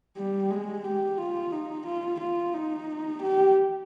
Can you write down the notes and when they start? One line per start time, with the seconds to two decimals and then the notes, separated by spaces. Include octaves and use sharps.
0.16 G3
0.50 G#3
0.84 G4
1.18 F4
1.52 D#4
1.86 F4
2.20 F4
2.54 D#4
3.22 G4